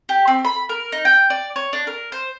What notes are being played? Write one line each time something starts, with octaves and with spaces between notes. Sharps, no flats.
G4
C4
B5
A#4
D#4
G5
D5
C#5
D4
A#4
C5